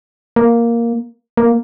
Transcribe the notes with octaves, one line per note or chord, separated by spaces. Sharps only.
A#3
A#3